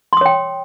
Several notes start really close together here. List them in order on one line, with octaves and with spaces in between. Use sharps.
C6 D#6 C#5 G5